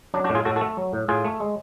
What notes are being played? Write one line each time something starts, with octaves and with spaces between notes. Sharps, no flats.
F#3 D4
D4 F#4
A2
F4 G#4
A2 F#4 A4
F#4 A4
A3
F#3
A2
A2 F4 G#4
A3
G#3